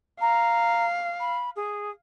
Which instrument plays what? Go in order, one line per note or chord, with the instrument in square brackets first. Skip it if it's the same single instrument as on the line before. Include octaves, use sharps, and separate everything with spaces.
[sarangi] F5 [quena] A#5
[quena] B5
G#4